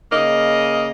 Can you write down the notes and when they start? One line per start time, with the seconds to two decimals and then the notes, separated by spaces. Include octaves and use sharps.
0.12 C#3 A#3 D#5